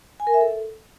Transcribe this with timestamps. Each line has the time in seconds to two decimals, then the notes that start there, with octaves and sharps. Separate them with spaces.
0.20 G#5
0.27 A#4
0.34 E5
0.41 A4